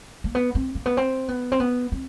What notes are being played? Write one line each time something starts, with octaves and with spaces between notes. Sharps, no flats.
A#3
B3
C4
A#3
B3
C4
B3
C4
B3
C4